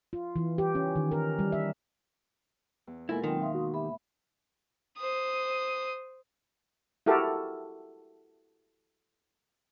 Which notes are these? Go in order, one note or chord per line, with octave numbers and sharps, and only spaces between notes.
F4
E3
G4
C#4
D#3
A#4
G3
E5
E2
B2 G#3 A#3 E4 F4 A4 A#4 G#5
D#3 F#3 C4 F4 G5
E5 F5 C6 D#6
F#4
G4 E5 B5
C5 D#6
E4 F#4 G4 A4 A#4